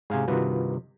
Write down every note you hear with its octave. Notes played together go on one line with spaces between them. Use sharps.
G#2 C3 G#4 F5 G#5
G2 C3 D#3 F4 F#4 B4